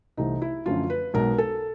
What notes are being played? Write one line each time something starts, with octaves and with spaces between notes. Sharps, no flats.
C2 C3 E3 A3 C4 D#4
E4
F#2 D3 F3 A3 C#4 F4
B4
B1 B2 G#3 B3 A#4
A4